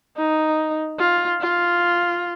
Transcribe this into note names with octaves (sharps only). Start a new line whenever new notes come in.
D#4
F4
F4